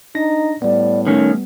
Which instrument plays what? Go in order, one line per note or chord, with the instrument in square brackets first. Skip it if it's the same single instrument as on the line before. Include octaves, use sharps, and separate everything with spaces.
[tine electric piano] D4 A#6 [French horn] D#4
[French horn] A2 [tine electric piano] G3 B3 [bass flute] D5
[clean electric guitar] D#3 C#4 [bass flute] A3